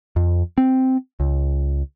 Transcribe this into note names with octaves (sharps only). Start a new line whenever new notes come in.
F2
C4
C#2